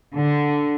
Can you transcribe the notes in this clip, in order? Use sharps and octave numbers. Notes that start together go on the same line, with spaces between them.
D3